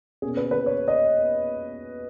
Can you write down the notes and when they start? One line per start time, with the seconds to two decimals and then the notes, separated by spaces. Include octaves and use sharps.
0.22 B2 A#3 C#4 G#4
0.37 B4
0.51 B4
0.66 C#5
0.88 D#5